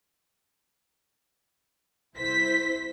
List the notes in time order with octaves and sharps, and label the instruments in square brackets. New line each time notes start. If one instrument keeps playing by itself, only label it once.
[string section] C2 E4 C5 B6